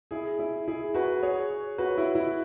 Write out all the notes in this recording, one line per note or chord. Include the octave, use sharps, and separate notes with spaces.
E4 G#4
E4
E4 G#4
F#4 B4
G#4 C#5
F#4 B4
E4
E4